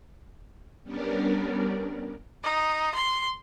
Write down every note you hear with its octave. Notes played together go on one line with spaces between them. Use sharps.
G3 B3 C#4 D4 A#4 D5
D#4
C6